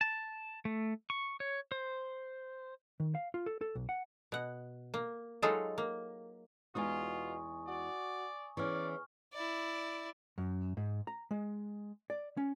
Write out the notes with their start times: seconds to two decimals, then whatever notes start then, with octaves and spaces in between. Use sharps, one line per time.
0.01 A5
0.65 A3
1.10 C#6
1.40 C#5
1.72 C5
3.00 D#3
3.15 F5
3.34 F4
3.46 A4
3.61 A4
3.75 B1
3.89 F#5
4.32 B2 F#5
4.94 A#3
5.42 F#3 G#3 D#4 F4 G#4 A4
5.78 A#3
6.75 E2 B2 G#3 D#4 F4 G#5 C#6 D#6
7.68 F#4 D5
8.57 E2 E3 C#4 D5 C#6 F6
9.33 E4 D5
10.38 F#2
10.77 G#2
11.07 A#5
11.31 G#3
12.10 D5
12.37 C#4